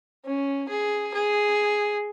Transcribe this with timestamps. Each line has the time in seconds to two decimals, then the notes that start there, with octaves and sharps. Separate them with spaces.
0.25 C#4
0.69 G#4
1.14 G#4